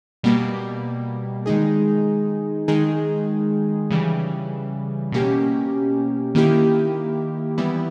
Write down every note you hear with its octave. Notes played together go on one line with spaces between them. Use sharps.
B2 G3 A#3
D#3 G#3 D#4 G#4
D#3 G#3 D#4 G#4
C#3 E3 G3
B2 A#3 C#4 G4
D#3 A#3 E4 G4
E3 G3 B3 E4